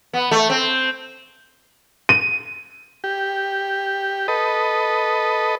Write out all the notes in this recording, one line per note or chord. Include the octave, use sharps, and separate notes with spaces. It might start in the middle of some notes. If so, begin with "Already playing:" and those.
B3
A3
C4
D#7
G4
A4 B4 D#5